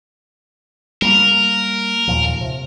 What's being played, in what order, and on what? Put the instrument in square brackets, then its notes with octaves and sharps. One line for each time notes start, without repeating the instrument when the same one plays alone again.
[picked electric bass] G3 A#3 [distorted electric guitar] A#4
[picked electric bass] D#2 A#2 F3
C3